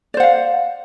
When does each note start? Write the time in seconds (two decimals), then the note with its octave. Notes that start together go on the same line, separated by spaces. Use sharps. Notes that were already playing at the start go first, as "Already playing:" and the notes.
0.14 D5
0.17 C5
0.20 F#5
0.23 F5